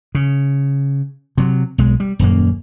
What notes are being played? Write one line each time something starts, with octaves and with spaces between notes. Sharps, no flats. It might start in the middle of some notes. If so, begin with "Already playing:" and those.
C#3
C3 F#3
B1 G#3
G3
D#1 F#2 A#3